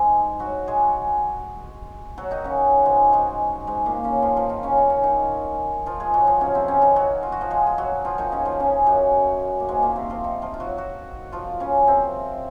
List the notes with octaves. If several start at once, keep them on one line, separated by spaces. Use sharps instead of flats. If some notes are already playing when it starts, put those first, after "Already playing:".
Already playing: G#2 G#3
F#3 F#4
G#3 G#4
F#3 F#4
D#3 D#4
C#3 C#4
G#2 G#3
G#2 G#3
G#2 G#3
A#2 A#3
C#3 C#4
F3 F4
F3 F4
D#3 D#4
C#3 C#4
D#4
C#4
D#3 D#4
F3 F4
G#3 G#4
F#3 F#4
F3 F4
C#3 C#4
C3 C4
C#3 C#4
D#3 D#4
F#3 F#4
F4
F#4
F3 F4
G#3 G#4
G#4
F#3 F#4
F3 F4
D#3 D#4
C#3 C#4
F3 F4
C#3 C#4
F#2 F#3
A#3
G#2 G#3
A#2 A#3
C3 C4
F3 F4
D#3 D#4
F3 F4
F4
F#3 F#4
F#3 F#4
F3 F4
C#3 C#4
C3 C4